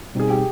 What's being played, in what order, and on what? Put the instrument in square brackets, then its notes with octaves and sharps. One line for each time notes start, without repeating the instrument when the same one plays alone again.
[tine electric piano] B2 G3 C4 D#4 [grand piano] G#4
[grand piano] G4